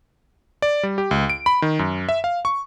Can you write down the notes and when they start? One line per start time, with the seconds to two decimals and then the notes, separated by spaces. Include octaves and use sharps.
0.62 D5
0.83 G3
0.98 G4
1.11 C#2
1.30 D7
1.46 B5
1.62 D#3
1.79 F#2
2.09 E5
2.24 F5
2.45 C#6